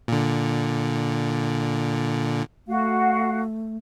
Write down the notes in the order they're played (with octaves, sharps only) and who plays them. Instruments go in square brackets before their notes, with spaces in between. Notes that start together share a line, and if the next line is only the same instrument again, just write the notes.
[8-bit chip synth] A#2 D3
[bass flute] A3 [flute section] F#4 F5